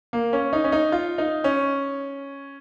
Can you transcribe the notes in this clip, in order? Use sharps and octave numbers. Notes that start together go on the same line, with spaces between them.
A#3
C#4
D#4
C#4
D#4
F4
D#4
C#4